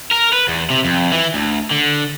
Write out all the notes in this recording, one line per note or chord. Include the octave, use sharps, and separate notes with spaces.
A#4
B4
E2
C3
F2
E3
D2
D3